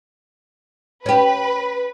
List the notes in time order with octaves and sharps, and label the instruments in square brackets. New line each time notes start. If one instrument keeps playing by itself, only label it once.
[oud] C#4 G4 [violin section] B4